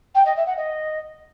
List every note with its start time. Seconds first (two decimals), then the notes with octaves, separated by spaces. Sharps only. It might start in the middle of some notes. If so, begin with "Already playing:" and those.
0.14 G5
0.25 D#5
0.35 E5
0.46 F#5
0.57 D#5